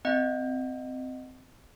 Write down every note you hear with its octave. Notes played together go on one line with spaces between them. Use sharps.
C4 D#5 F#5